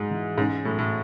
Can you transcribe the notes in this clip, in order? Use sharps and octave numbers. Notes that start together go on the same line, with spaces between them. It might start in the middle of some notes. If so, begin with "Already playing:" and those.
Already playing: G#2 F#3 G#3
E3
G#2 C#4
A2 F#3
A2